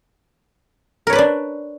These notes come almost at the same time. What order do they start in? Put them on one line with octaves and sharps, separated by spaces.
A#4 C#5 B4 D5 D4